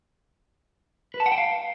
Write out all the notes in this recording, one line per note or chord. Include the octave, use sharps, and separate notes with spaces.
B4
A5
F#5
G5
F5